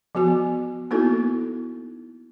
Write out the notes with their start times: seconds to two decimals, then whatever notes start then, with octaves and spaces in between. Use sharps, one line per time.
0.15 F3 B3 F#4 G#5
0.91 A#3 B3 D#4 E4 F#4 A4